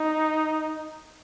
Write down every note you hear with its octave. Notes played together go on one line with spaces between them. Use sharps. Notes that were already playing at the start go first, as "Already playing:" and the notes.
Already playing: D#4